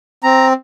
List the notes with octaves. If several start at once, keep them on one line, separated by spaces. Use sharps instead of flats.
C4 A#5